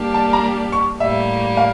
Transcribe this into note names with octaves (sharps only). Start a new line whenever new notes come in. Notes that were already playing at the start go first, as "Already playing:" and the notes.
Already playing: G3 A#3 D4 G4
A5
A#5
C#6
A2 G3 A#3 E5
F5